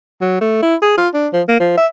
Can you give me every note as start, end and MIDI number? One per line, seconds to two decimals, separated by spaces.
0.21 0.39 54
0.41 0.62 57
0.62 0.75 64
0.82 0.94 68
0.98 1.08 65
1.14 1.28 62
1.33 1.42 53
1.48 1.58 58
1.60 1.76 53
1.77 1.87 76